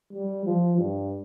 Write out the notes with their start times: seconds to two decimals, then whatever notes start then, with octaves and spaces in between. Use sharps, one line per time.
0.13 G3
0.46 F3
0.78 G2